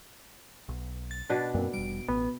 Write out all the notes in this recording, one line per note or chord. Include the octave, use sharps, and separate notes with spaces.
B1
A6
B2 D4 B4
F#2 A#2 C4
F1 G3 D7
A1 B3